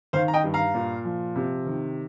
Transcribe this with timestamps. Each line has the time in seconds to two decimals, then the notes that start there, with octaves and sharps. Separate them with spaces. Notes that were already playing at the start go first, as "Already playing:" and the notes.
0.13 D#3 C5 F5
0.28 A#5
0.34 D#5 G5
0.44 G2
0.54 F5 A#5
0.74 A#2
1.05 F3
1.36 C3
1.66 D#3